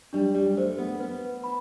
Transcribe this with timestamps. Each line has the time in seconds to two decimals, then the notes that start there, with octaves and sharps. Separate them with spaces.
0.13 G3 D4
0.34 G3
0.57 A3 C5
0.78 B3
1.00 B3 B4
1.44 B5